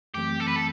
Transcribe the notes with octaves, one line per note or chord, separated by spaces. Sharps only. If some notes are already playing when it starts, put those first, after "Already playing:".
F#2 E3 A3 C4 G4
A4
B4
A4